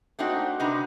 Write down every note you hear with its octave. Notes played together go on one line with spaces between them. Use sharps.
A3 A#3 C4 D4 D#4 F#4
C3 D4 D#4 F#4 B4 A#5